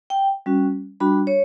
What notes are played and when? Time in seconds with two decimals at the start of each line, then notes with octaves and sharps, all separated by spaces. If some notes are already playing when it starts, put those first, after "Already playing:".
0.10 G5
0.46 G3 C#4 F#4
1.00 G3 D4 F#4 B5
1.27 C#5